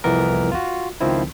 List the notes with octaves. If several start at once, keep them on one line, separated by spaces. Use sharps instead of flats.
C2 F2 E3 B3 A#4
F4 F#4
C#2 D#3 F3 C4 E4